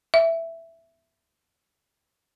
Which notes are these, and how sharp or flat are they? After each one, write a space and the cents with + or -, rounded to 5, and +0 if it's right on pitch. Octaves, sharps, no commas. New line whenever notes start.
E5 +5